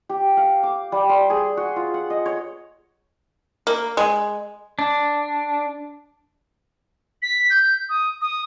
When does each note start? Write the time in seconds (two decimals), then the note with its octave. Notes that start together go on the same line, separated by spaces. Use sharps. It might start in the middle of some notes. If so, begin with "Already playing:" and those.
0.09 G4
0.37 F5
0.63 D6
0.92 G3
1.09 C5
1.30 G#4
1.57 F#4
1.76 F4
1.94 F#5
2.10 D#5
2.26 C#5
3.67 A#3
3.97 G#3
4.79 D4
7.22 B6
7.50 G6
7.89 D#6
8.21 D#6